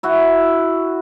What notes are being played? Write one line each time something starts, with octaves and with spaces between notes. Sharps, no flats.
E4 F#4